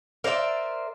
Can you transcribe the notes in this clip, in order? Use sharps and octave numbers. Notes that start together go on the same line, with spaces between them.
A#4 C5 D5 E5